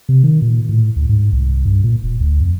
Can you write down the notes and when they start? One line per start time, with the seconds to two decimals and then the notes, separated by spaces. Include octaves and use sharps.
0.09 C3
0.24 D#3
0.42 A#2
0.69 A2
0.96 D2
1.09 G#2
1.32 C2
1.65 G2
1.84 A#2
2.03 D#1
2.21 D2
2.40 F2